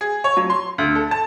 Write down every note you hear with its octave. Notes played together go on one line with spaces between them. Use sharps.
G#4
C#5
F#3
C6
D2
A4
A5